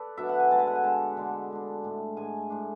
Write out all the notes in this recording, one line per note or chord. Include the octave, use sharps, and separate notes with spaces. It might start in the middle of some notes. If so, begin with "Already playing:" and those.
Already playing: A4 B4 D5
B2 F#3 B3 D4 E5
F#5
G#5
D3 G#3 D4 A5
G#5
F#5
G#5
D3 G#3 D4 A5
D3 G#3 D4
D3 G#3 D4
A2 G#3 D4
A2 G#3 D4 G#5
A2 G#3 D4